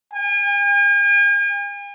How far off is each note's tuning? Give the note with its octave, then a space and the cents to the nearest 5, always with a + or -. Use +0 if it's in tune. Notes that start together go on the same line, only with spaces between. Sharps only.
G#5 -45